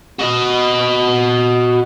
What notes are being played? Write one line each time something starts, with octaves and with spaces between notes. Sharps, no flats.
F#4 D#5